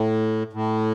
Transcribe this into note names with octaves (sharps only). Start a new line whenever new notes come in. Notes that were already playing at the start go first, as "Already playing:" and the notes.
Already playing: A2
A2